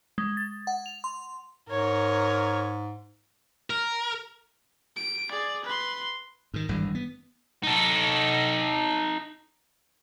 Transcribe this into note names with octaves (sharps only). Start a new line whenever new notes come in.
G#3
A6
F#5
F7
C6
G#2 A#4 C#5
A#4
D7
G#4 D5
B4 C6
G#2 D#3
G#1 G2 E3 G#3
B3
D#4 A4